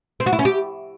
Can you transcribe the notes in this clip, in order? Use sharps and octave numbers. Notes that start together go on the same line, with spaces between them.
C4
F#4
E4
C#4
G4